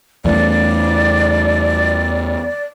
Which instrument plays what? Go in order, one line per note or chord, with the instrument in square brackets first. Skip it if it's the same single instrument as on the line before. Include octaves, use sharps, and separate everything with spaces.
[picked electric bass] E2 E3 A3 [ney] D5